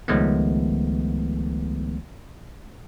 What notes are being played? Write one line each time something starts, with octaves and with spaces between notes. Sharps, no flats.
C#2 D#3 F3 G#3 A3 B3